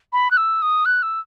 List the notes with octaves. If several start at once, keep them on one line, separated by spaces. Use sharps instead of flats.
B5
F#6
E6
D#6
F#6
E6